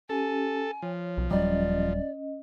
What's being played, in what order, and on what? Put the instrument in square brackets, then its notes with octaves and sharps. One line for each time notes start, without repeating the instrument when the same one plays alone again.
[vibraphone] C#4 G4 [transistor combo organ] A4 [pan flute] G#5
[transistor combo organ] F3 [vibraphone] C#5
[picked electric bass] B1
[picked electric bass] D#1 F#3 G3 [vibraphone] C#4 D#5 [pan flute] D5